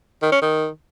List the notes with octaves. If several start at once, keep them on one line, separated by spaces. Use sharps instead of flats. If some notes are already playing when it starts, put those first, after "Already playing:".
D#3
C#4
D#3